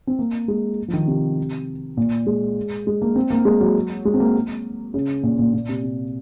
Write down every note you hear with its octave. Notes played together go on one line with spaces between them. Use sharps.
C4
A#3
G#3
F3
D#3
C3
A#2
G#3
G#3
A#3
C4
A#3
G#3
F#3
G#3
C4
A#3
C#3
A#2
A#2
A#2
C3
C3